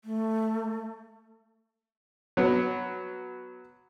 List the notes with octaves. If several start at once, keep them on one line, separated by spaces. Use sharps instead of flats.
A3
F#3 B3